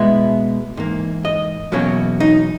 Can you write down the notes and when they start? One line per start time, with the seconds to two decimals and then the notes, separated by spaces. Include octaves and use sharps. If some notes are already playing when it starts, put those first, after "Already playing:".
Already playing: B2 G#3 B3 E4
0.77 G#2 E3 A#3
1.25 D#5
1.72 E2 B2 F#3 A#3 C#4 C#5
2.20 D#4